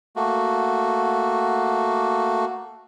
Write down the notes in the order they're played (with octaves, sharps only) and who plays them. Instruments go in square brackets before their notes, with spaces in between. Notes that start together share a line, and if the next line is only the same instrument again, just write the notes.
[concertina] A3 A#3 F#4